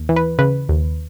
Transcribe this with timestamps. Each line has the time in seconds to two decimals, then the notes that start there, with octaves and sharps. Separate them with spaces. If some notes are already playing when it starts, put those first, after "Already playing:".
Already playing: D#2
0.09 E3
0.16 B4
0.39 C#3 B4
0.69 D#2